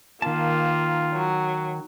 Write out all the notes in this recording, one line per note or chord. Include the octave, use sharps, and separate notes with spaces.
D#3 A#3 F4 A5
F#3